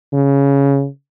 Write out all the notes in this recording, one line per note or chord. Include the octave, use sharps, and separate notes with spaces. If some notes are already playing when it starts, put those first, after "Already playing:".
C#3